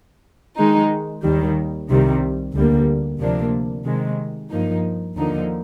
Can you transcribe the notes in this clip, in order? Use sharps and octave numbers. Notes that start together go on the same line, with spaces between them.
D#3 G#3 D#4
D#2 D#3 G3
C2 C3 D#3 G3
D2 D3 G3 A#3
D2 C3 F3 A#3 D4
C3 D#3 G#3
G2 F3 A#3 D#4
D#2 D3 F3 A#3 D#4